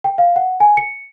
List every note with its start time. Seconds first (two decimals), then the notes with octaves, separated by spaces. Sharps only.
0.04 G5
0.18 F5
0.36 F#5
0.60 G#5
0.77 C#7